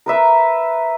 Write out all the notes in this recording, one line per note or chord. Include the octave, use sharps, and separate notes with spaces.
A#4 B4 E5